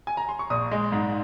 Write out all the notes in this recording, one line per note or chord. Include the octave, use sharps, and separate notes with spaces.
G#5
A#5
C6
C#6
A#1 D#6
G#3
G#2